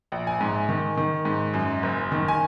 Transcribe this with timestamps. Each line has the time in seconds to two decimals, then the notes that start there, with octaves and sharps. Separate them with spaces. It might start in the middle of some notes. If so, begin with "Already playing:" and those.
0.12 A#1
0.27 G#5
0.41 G#2
0.69 D#3
0.97 D#3
1.25 G#2
1.54 F#2
1.83 F#1
2.12 D#3
2.28 G#5